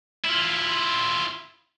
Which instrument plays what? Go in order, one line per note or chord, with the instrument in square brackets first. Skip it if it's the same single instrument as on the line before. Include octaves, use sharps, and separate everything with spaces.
[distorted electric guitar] E4 F4